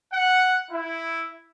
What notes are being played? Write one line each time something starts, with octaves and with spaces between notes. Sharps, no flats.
F#5
E4